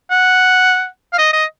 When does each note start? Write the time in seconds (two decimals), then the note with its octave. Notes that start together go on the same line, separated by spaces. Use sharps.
0.11 F#5
1.13 F5
1.18 D#5
1.33 D#5